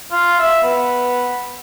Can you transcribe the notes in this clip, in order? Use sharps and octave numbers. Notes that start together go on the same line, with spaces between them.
F4
E5
B3